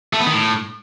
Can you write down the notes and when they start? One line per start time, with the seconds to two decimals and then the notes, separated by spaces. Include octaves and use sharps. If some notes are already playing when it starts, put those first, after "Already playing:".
0.13 A3
0.20 B3
0.27 D#3
0.33 A2